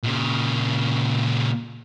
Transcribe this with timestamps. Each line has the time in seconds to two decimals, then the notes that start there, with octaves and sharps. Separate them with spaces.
0.03 A#2 C#3